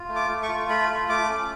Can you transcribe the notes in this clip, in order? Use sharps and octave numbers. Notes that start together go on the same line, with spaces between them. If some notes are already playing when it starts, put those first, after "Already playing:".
Already playing: F4
A3
D6
A3
C#6
F4
A3 B5
F4
A3 D6
C#4